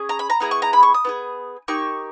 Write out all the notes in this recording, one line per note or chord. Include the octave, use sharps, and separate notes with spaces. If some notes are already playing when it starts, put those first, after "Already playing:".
Already playing: C#4 G#4
A#5
B5
A#5
B3 E4 G#4 A#5
C#6
A#5
B5
C#6
D#6
B3 E4 G#4
A#3 D#4 G4 C#6